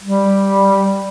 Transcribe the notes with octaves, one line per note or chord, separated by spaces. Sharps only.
G3